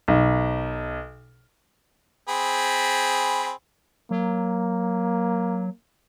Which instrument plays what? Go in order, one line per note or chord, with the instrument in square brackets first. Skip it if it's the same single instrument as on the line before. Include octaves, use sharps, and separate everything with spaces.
[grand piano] B1
[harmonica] C4 G#4 B5
[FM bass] F#3 [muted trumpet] A#3